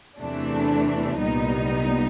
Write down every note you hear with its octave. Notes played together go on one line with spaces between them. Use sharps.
E2 C3 E3 A3 D4
C2 A#2 G3 B3 D#4